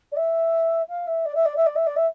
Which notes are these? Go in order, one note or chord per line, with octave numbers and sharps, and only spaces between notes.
D5
E5
F5
E5
D5
E5
D5
E5
D5
E5
D5
E5